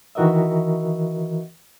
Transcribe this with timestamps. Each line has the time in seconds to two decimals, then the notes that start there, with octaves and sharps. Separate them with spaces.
0.15 D#3 E3 F#4 A#4 D#5 E5